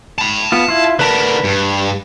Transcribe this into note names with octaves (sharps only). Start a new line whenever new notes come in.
A5 B5
B3 F4
E4 F4
D3 A#4 B4 A5 B5
G2